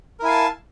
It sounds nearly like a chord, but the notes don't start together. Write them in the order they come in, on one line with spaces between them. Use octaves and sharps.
A#4 E4 G#5 F5 A5